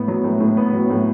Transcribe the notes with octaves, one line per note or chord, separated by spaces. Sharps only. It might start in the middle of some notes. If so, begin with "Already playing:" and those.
Already playing: A2 B3
F#3
A2
A2
B3
F#3
A2